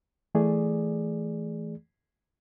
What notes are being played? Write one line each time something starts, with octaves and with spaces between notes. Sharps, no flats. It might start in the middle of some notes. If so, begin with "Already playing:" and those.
E3 A3 G#4 D5